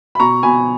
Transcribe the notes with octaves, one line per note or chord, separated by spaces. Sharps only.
B5
B2 A#5 C#6
B2 G#5 B5